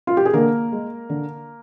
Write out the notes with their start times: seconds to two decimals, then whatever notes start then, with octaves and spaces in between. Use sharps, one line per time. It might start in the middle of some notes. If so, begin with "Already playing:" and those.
0.07 F4
0.17 G4
0.25 G#4
0.33 D3 A#3 A#4
0.72 G#3
1.10 D3